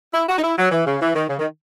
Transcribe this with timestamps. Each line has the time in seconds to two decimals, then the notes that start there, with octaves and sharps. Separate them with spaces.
0.14 E4
0.29 F#4
0.38 D#4
0.43 E4
0.58 F#3
0.71 E3
0.86 C#3
1.01 E3
1.15 D#3
1.29 C#3
1.39 D#3